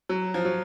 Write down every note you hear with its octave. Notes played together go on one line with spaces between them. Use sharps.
F#3
F3
F#3